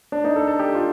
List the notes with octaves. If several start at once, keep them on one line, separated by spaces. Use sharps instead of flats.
D4
D#4
A4
A4
G4
F4